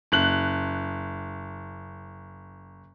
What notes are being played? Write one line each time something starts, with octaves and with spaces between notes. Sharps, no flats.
F#1 F#6 F#7